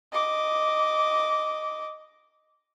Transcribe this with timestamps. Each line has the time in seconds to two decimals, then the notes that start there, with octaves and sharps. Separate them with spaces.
0.12 D#5 D6